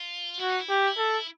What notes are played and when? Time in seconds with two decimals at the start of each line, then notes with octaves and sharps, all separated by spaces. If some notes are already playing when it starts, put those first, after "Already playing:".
Already playing: F4
0.40 E4 F#4
0.50 D#4
0.59 E4
0.69 G4
0.98 A4